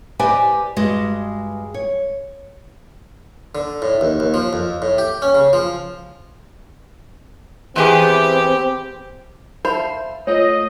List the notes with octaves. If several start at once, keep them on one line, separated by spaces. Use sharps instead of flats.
G4 B4 C5 D5 D#5 G#5
G2 G#3 F#4 D#5
C#5
D3
A2
D#2
D#2
F3
F2
A2
G4
C#4
C#3
F3
E2 B3 C4 G4 G#4
C5 E5 F5 A5 B5
A3 F4 C#5 D#5